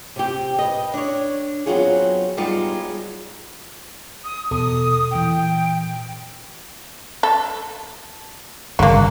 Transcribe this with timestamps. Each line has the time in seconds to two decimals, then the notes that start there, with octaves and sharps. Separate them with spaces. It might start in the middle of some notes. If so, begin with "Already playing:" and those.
0.16 C3 G4
0.59 B4 D#5
0.94 D4 C#5
1.66 F#3 B3 C4 F4 F#4 G#4
2.37 G3 G#3 B3 D#4 F4 F#4
4.25 D#6
4.51 E2 B2 A4 D#6
5.11 A#2 E3 G5
7.23 A4
8.79 G1 C#3 A#3 F#4